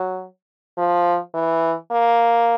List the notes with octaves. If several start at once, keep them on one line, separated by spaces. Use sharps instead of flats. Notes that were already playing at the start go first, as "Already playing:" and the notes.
Already playing: F#3
F3
E3
A#3